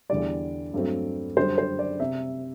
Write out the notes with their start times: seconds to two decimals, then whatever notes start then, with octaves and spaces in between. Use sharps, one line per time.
0.09 E2 D3 G3 D5
0.73 G2 F#3 A3 C4
1.37 F#2 D3 G3 C5
1.58 C5
1.79 D5
2.00 C3 E5